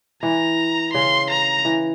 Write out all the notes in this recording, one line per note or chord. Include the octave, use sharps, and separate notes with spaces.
E3 A#5
C#3 C6
A#5
E3